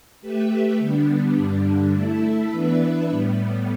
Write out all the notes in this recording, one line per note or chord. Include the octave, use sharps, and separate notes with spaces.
A3 G4 B4 E5
D3 G3 B3 D4
G2 D3 G3 D4
A3 E4 A4 E5
E3 B3 D4 B4 E5
A2 G3 B3